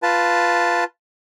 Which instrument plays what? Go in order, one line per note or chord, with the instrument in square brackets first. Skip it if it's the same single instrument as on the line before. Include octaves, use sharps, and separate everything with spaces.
[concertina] F4 B4 A5